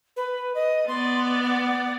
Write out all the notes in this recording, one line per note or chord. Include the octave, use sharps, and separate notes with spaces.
B4
D#5
B3 D5 C6
F#5